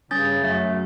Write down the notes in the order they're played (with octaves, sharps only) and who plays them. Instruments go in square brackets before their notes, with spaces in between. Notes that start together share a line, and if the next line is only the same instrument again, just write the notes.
[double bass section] G2 [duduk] C#3 [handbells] C#4 G6 A6
[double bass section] F#2 [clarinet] A3